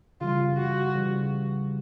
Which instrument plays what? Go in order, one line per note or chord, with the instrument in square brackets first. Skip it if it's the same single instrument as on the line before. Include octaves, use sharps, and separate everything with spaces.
[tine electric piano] C#3 E3 G3 [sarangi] F4
[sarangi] F#4
[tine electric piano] C#3 E3 G3